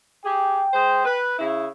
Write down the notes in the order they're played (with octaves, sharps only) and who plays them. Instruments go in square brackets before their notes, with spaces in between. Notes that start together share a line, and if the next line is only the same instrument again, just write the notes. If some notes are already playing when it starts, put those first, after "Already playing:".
[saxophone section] G4 G#4 [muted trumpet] G5
[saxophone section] G#3 C5
B4
C#3 E4